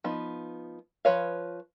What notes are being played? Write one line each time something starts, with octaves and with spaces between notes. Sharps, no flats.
F3 B3 D#4
F3 B4 C#5 F5